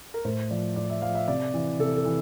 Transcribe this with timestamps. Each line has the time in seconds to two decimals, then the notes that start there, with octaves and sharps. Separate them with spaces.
0.14 A#4
0.25 A2 C5
0.50 F3 D5
0.76 A2 D5
0.90 E5
1.02 F3 F5
1.15 E5
1.28 C3 D5
1.54 E3
1.79 C3 A4
1.96 A4
2.05 E3